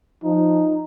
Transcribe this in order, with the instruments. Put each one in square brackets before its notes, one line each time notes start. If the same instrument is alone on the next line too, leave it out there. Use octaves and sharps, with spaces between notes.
[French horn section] F3 [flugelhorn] D#4